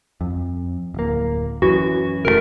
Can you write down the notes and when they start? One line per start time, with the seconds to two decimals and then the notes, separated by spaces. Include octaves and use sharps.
0.21 F2
0.94 D1 A#3
1.62 F#2 E3 F#4
2.25 F1 C#3 A3 A#4